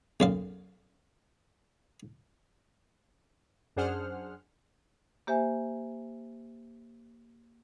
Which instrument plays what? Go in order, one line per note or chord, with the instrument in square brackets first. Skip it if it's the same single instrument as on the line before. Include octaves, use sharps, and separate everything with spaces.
[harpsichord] B1 F#2 F5
[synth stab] F#2 D4 G#4 C5 F#5 F6
[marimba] A#3 G4 C5 E5 G#5